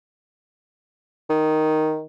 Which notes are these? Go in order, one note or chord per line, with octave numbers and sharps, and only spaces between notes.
D#3